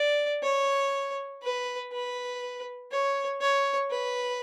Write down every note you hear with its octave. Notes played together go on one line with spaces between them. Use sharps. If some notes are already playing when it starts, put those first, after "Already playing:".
Already playing: D5
C#5
B4
B4
C#5
C#5
B4